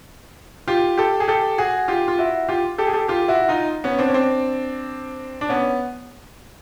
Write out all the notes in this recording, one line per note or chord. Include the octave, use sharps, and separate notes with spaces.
F4 G4
G4 A4
G#4
G4 A4
F#4 G#4
F4 G4
F4
E4 F#4
F4 G4
G4 A4
G#4
G4 A4
F4 G4
E4 F#4
D#4 F4
B3 C#4
C4 D4
C#4
C4 D4
D4
B3 C#4